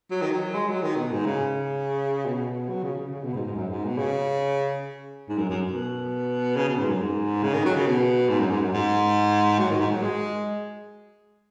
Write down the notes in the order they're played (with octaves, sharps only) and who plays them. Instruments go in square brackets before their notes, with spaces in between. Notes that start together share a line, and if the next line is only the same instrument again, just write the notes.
[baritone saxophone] F#3
D#3
F#3
G#3
F#3
D#3
B2
G#2
C#3
B2
F#3
C#3
C#3
C#3
B2
G#2
G#2
F#2
G#2
B2
C#3
G#2
F#2
F#2
B2
C#3
B2
G#2
F#2
G#2
C#3
D#3
F#3
C#3
B2
G#2
F#2
G#2
F#2
G#2
F#3
D#3
G#2
F#3
G#3